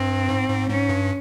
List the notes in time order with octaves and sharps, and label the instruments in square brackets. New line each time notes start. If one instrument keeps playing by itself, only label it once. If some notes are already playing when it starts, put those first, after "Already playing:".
Already playing: [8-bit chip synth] G2 [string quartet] C4
[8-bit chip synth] G#2
G#2
[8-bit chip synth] G#2 [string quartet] C#4
[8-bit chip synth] G2